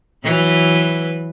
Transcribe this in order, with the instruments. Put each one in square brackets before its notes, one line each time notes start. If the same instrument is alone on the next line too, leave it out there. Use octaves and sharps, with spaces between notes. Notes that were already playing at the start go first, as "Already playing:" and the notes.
[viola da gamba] E3 F#3 B4